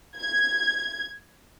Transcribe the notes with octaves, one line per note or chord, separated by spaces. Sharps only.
G#6